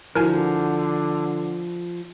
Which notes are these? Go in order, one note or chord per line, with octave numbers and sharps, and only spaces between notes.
D3 F3 E4 F#4 A#4 G#5